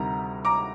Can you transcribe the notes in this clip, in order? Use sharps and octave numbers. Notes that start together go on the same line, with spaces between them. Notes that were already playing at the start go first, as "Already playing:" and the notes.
Already playing: D2 C3 D#3 G3 A#5
A#5 D6